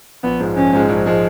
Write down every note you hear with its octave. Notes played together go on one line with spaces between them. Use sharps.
A#1 B3
G#2 F3 G#3
A#1 C#4
G#2 F3 G#3
A#1
F3 G#3